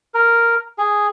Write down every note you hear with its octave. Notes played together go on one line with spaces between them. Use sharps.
A#4
G#4